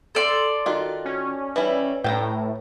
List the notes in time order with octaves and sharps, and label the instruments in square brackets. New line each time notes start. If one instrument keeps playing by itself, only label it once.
[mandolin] A4 D5 C6
[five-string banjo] D#3 F4 [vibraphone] F#4
[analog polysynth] C#4
[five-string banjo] E3 G3 E4 [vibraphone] B4
[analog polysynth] A2 [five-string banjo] G5 A5 A#5